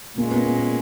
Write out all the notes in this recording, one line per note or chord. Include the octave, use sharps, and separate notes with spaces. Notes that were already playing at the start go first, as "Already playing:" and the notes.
A#2 G#3 A#3 C#4
B3
A#3
B3